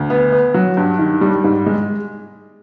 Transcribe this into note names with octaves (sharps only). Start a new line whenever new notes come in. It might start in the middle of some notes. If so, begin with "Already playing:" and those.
Already playing: D2
B3
B3
F#3
G2
D#3
G3
G#2
G#3